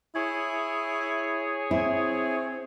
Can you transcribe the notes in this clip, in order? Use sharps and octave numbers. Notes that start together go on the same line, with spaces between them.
E4 G#4 C#5
C4 E4